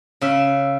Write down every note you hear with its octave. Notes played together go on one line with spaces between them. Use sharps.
C#3 E5